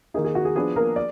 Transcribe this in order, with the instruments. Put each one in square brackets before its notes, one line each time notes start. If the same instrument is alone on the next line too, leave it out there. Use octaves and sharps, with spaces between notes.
[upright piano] D#3 A#3 D#4 G#4
G#4
F#4
G#4
F3 B3 D4 G#4
A#3 A#4
D5